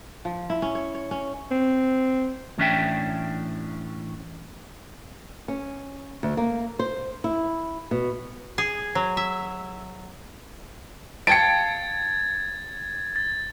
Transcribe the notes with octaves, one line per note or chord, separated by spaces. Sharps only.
F3
E4
C#4
C#5
C#5
C#4
C4
A2 E3 C#4 D4 E5 G5
C#4
D2
A#3
C5
E4
B2
G#4
F#3
E5
F5 G5 A5 G#6 A6 C#7 D7
A6